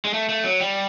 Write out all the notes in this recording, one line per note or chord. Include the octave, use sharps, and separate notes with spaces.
G#3
A3
A3
F#3
G3